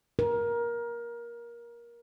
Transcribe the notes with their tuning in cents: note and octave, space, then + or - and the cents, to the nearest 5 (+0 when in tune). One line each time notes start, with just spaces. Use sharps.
A#4 +20